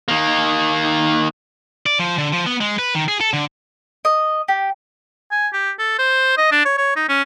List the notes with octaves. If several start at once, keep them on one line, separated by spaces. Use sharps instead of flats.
D#3 A#3
D5
F3
D3
F3
B3
G#3
B4
D#3
G#4
A4
D3
D#5
G4
G#5
G4
A4
C5
D#5
D4
C#5
C#5
D#4
C#4